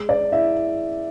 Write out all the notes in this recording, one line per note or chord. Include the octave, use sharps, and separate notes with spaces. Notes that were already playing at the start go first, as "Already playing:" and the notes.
Already playing: G#3
D5
E4 E5